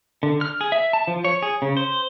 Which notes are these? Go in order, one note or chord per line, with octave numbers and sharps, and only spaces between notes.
D3
F6
G#4
E5
A5
F3
C#5
G#4
C#3
C5